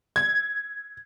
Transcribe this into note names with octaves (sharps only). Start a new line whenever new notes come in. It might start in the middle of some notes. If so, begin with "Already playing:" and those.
G#6